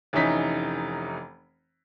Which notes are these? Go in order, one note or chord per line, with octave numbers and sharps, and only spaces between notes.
F1 E3 C#4 D#4 B6